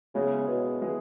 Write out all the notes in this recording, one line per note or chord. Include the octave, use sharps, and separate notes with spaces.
C#3 G#3 B3 E4 G#4
B2
G#3 B3 E4 G#4